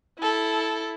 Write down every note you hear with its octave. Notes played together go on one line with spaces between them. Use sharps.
E4 A4